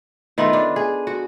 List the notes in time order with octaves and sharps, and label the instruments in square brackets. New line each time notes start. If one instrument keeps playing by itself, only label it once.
[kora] D#3 A3 B3 F4
D4
G#4
F#4